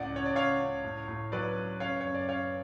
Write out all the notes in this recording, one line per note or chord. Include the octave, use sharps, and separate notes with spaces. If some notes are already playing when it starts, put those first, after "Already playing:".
Already playing: C#2 A2 D5 F#5
C#3 C#5
D5
C#2 C#5 F5
C#2
A2
A2
F#3 B4 D5
F#3
C#3 C#5 F5
F#2 C#5
D5
C#3 C#5 F5